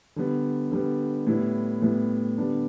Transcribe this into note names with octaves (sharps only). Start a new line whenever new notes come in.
D3 G3 B3
D3 G3 B3
A2 G3 B3 E4
A2 G3 B3 E4
D3 G3 B3 D4